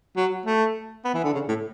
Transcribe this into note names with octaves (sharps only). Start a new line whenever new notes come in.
F#3
A3
B3
E3
D3
C#3
A2